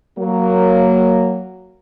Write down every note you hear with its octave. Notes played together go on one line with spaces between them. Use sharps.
F#3 A#3